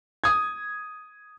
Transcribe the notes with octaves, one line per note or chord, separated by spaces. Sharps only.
D#6 G#6